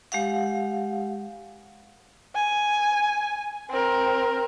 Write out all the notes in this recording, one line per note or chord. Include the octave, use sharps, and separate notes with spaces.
G#3 G4 F5 F#5
G#5
C4 A#4